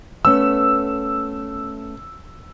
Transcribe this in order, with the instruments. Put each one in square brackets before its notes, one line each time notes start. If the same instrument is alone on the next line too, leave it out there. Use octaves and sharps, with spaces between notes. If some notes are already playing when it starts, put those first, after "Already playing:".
[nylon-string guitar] A3 B3 C#4 [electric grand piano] E6